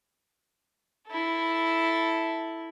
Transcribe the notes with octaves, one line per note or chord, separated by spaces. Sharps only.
E4 A4